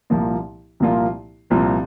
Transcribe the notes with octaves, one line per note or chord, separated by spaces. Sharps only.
C2 A#2 F3 A#3 F4
C2 A#2 F3 A#3 F4
C2 A#2 F3 C4